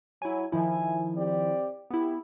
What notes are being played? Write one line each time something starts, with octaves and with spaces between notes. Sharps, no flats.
F#3 E4 G#5
D#3 F3 E4 E5 G#5
C4 G4 D5
B3 E4 G4